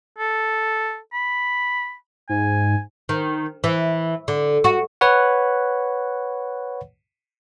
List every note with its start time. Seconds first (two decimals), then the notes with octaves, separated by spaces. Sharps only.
0.18 A4
1.13 B5
2.29 G#2 G#5
3.09 D#3
3.64 E3
4.28 D3
4.64 F#4
5.01 B4 C#5 F#5